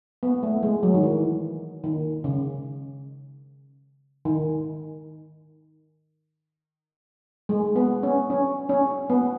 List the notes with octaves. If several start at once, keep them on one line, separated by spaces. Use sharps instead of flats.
B3
A3
G#3
F#3
D#3
E3
D#3
C#3
D#3
G#3
B3
C#4
C#4
C#4
B3